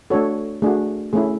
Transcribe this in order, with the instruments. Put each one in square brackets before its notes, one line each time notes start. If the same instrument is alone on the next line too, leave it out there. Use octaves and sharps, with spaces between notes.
[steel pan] A3 D4 F#4 A4 C#5
A3 D4 F#4 G#4
A3 C#4 E4 G#4